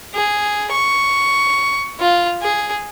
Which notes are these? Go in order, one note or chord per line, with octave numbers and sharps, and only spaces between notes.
G#4
C#6
F4
G#4